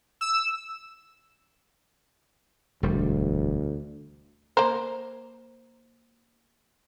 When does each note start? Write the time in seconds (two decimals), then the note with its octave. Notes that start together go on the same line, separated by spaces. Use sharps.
0.21 E6
2.83 E1 D2 G3
4.57 A#3 C5 A#5